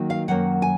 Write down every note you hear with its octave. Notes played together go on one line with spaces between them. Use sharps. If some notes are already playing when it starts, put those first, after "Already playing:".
Already playing: D#3 F#3 A#3
F5
F#2 D#3 F#3 A#3 F#5
G#5